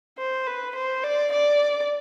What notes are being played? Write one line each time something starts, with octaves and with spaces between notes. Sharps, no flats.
C5
B4
C5
D5
D5